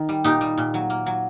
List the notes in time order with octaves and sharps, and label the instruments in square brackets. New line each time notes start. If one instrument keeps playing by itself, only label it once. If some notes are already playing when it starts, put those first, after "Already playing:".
Already playing: [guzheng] D#3
G3
A#2 D#4 G4
G3
A#2
F#3
A#3
F#3